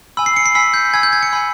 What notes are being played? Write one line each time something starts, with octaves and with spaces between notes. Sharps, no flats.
G#5 B5 E6
C7
C#7
C7
G#5 B5 E6 B6
G6
G#5 B5 E6 G#6
G6
G#6
C#7
G#5 B5 E6